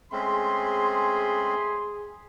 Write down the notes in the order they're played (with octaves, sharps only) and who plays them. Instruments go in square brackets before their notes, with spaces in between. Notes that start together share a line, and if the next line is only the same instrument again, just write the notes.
[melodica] G#3 C4 C#4 [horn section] A3 B5 C6 [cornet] G#4